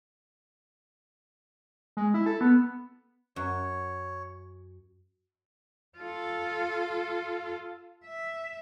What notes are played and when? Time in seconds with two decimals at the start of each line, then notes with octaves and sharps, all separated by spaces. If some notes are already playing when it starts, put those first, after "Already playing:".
1.97 G#3
2.14 E4
2.26 A4
2.41 B3
3.36 F#2 C#5
5.98 F4 A4
8.06 E5